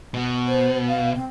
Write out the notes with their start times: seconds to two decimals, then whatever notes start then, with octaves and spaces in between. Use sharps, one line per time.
0.14 B2
0.48 C5
0.88 F5
1.15 C4